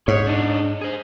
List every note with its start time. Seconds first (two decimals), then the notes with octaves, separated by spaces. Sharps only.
0.08 G#2 C#5
0.27 D4 D#4
0.81 G#4 C5